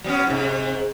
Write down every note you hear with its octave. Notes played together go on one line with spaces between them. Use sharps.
F#3 B3 C#4
G#2 C3